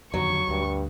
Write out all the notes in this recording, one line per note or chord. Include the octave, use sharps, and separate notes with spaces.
F2 D3 D#3 F#3 C#6
D2 G2